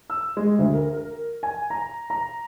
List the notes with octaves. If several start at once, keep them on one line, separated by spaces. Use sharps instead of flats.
E6
G#3
D2
A#4
A#4
G#5
A#5
A#5